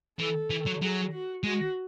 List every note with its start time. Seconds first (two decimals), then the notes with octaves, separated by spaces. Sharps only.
0.19 E3 A4
0.50 E3
0.66 F#3
0.82 F#3 G#4
1.12 F#4
1.43 G#3 F#4